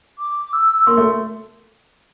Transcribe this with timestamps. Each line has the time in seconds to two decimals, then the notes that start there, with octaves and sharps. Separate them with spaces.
0.19 D6
0.53 E6
0.87 A#3 C6
0.97 A3